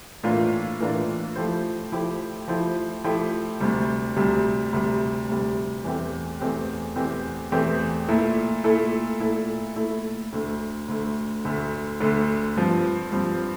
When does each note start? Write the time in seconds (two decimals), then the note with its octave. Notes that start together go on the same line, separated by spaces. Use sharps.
0.23 A2 E3 A#3 D4 F4
0.80 A2 E3 A#3 D4 F4
1.36 F3 A3 E4 G4 C5
1.92 F3 A3 E4 G4 C5
2.48 F3 A3 E4 G4 C5
3.04 F3 A3 E4 G4 C5
3.60 D2 C3 G3
4.16 D2 C3 G3
4.72 D2 C3 G3
5.29 D2 C3 G3
5.84 E2 E3 A3 C4 G4
6.40 E2 E3 A3 C4 G4
6.96 E2 E3 A3 C4 G4
7.52 E2 E3 A3 C4 G4
8.08 A#2 A3 E4 A4
8.64 A#2 A3 E4 A4
9.20 A#2 A3 E4 A4
9.76 A#2 A3 E4 A4
10.33 D2 D3 A3
10.88 D2 D3 A3
11.45 D2 D3 A3
12.00 D2 D3 A3
12.56 G2 F3 C4
13.12 G2 F3 C4